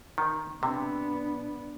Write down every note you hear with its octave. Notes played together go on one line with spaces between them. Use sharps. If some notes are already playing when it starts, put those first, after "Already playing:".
D#3
C3 B3 D4